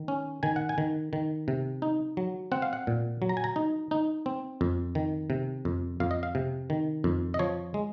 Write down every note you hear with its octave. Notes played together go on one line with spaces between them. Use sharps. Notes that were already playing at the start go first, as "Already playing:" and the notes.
Already playing: D#3
C#4
D#3 G#5
F#5
G#5
D#3
D#3
C3
D#4
F#3
C4 F#5
F5
F#5
A#2
F#3
A#5
G#5
A#5
D#4
D#4
C4
F2
D#3
C3
F2
F2 F5
D#5
F5
C3
D#3
F2
D#5
F3 C#5
G#3